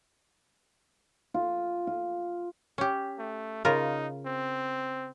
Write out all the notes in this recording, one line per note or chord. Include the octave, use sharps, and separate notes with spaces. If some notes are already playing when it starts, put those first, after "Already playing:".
F4
F4
C#4 G4
A3
C#3 D#4 F4 A#4
C4